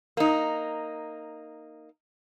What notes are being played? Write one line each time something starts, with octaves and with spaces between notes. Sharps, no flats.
A#3 D#4